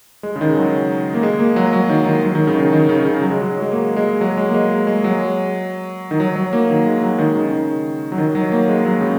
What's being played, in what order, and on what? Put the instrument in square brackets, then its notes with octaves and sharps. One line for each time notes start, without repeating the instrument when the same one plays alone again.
[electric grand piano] G#3
C#3
D#3
F#3
A#3
G#3
A#3
F#3
F#3
D#3
D#3
F#3
D#3
C#3
D#3
D#3
C#3
C#3
F#3
G#3
F#3
G#3
A#3
G#3
F#3
G#3
A#3
G#3
G#3
F#3
D#3
F#3
F#3
A#3
D#3
G#3
F#3
D#3
C#3
D#3
F#3
D#3
F#3
A#3
G#3
F#3
C#3